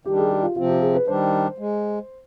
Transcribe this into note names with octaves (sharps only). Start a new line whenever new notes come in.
D#3 G3 D4 G4
G#4
G4
F4
C3 F3 C4 F4
G4
G#4
B4
D#3 G3 D4 C5
G#3